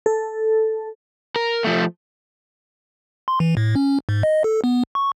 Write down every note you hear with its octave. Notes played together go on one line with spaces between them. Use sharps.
A4
A#4
F3 A3
C6
E3
A2
C#4
G#2
D#5
A4
B3
C#6